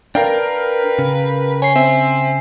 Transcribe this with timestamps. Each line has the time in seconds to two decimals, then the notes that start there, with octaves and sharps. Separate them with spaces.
0.15 D4 A#4 B4 F5 G5
0.99 C#3
1.62 C#5 G#5 C7
1.76 C4 E5